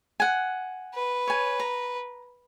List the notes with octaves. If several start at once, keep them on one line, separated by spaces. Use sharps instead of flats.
F#5 G#5
B4
C#5 G#5
A#5